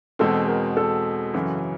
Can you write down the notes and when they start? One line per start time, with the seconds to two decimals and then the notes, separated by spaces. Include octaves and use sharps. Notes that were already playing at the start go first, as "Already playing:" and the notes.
0.19 E2 B2 G#3 C4 A4
0.48 A#4
0.77 A4
1.34 F#2 C#3 E3